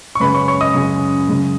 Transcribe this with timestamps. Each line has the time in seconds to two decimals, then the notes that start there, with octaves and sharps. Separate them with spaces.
0.15 C#6
0.20 F#2 C#3 G#3 B4 B5
0.34 C#5 C#6
0.48 C#5 C#6
0.61 D#5 D#6
0.74 F#2 C#3 G#3
1.29 F#2 C#3 G#3